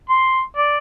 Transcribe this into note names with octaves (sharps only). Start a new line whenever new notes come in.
C6
D5